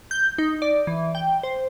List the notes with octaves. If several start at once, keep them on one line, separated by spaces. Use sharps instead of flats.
G6
D#4
D5
E3
G5
C5